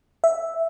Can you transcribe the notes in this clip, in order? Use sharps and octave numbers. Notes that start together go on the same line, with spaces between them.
E5